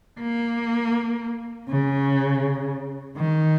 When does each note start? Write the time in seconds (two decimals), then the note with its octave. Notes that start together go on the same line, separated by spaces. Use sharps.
0.20 A#3
1.69 C#3
3.17 D#3